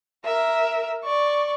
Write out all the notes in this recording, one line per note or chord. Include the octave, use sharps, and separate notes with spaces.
A#4 E5
D5 C#6